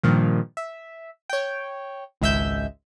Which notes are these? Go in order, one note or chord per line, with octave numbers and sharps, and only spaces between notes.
G2 A#2 D#3 F3
E5
C#5 G5
G#1 C#2 G#3 E5 E6 G6